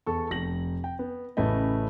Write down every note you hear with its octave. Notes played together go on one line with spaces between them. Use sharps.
E2 A4 C#6
F1 A#6 F#7
G5
B3
A1 A2 C#3 A3 B4 D#5